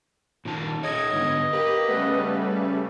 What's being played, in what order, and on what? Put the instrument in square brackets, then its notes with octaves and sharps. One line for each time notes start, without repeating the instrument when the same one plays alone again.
[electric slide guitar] A#2 D#3 A5
[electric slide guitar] D#4 G#4 C#5 [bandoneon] D#5 [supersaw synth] G#6
[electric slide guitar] G#2 D3 B3
[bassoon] A#3 [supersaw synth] G4 [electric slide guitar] B4
[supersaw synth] C#3 G3 A3 [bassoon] B3